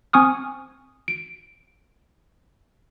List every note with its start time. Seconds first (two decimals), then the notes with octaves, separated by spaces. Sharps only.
0.13 C4 G#5 C#6 D#6 F6
1.08 D7